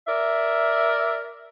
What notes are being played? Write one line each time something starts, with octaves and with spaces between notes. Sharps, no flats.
A#4 D5 E5